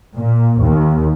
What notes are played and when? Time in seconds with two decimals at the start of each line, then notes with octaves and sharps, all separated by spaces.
0.15 A#2
0.63 D#2